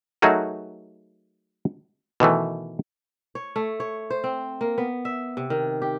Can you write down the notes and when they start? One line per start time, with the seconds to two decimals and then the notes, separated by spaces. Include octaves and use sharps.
0.22 F#3 A3 D#4 F#4 G#4 A#4
2.20 B2 D#3 E3 A3
3.35 C#5
3.56 A3
3.80 C#5
4.10 C5
4.24 C4
4.61 A#3
4.78 B3
5.05 E5
5.37 C3
5.50 D#3
5.82 G4